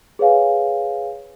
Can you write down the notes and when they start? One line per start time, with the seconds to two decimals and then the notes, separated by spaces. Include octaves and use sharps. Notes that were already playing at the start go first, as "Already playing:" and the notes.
0.19 G#4 B4 C#5 F5 G#5